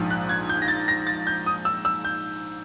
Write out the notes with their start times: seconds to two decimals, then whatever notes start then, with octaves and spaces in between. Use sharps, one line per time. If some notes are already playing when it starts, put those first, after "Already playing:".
Already playing: A#1 G#2 F3
0.10 F#6
0.29 G#6
0.49 G6
0.62 A#6
0.68 A6
0.88 A#6
1.07 A6
1.27 G6
1.46 D#6
1.65 E6
1.85 E6
2.05 G6